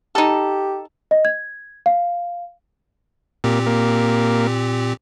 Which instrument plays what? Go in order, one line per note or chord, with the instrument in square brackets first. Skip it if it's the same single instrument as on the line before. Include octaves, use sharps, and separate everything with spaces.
[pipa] D#4 A4 [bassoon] G4
[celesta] D#5
G#6
F5
[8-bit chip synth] A#2 C4 G4 [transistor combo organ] A#3
[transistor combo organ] A#3